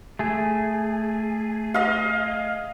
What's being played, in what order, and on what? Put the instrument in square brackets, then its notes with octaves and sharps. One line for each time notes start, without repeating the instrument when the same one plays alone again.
[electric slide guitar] A3 G#4
[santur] D#5 F5